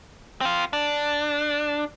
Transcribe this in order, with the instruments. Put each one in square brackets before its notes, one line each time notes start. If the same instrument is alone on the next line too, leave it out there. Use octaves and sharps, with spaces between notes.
[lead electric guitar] C4 F4
D4